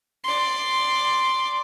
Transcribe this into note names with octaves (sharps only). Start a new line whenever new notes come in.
D5 C6